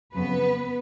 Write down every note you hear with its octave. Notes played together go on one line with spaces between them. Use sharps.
F2 C#3 F#3 B3 B4